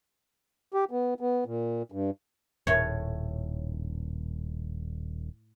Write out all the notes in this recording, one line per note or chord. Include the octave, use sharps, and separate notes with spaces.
G4
B3
B3
A#2
G2
D#1 A2 C#5